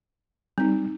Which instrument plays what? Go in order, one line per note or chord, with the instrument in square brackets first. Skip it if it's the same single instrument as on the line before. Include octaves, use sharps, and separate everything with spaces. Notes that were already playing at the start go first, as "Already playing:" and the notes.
[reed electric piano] G3 [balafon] C4 D#4